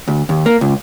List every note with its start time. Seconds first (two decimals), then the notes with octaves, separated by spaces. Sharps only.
0.08 D2
0.29 D#2
0.46 A#3
0.61 C#2